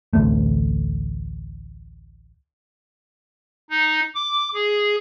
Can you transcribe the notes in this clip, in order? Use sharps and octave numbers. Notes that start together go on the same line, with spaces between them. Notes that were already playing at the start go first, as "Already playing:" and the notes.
A1 D2 C3 A3
D#4
D6
G#4